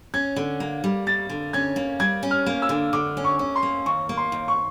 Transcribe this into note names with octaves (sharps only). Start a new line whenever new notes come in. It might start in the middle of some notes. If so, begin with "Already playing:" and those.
C#4 G#6
D3
A#3
G3
A#3 A6
D3
C#4 G#6
A#3
G3 G#6
C#4
F6
A#3
E6
D3
D3 D6
C#4
C#6
C#4
C6
A#3
D#2 C#6
A#3
C6
D#2
C#6